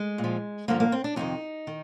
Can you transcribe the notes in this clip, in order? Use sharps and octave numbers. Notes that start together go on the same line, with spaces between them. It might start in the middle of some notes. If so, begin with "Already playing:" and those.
Already playing: G#3
A#2
F3
G2 D3 F3 A#3
A#3
C4
D4
F2 C3 D#3 D#4
D#3